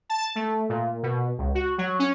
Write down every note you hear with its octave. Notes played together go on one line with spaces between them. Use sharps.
A5
A3
A#2
B2
C#2
F#4
F#3
C#4